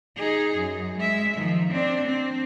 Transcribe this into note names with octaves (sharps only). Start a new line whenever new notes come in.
D#4 G#4
F#2
G#3 E5
D#3 F3
C4 D4
C4